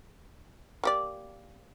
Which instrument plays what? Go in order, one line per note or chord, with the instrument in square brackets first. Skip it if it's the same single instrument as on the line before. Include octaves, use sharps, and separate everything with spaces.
[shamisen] A#3 G4 D5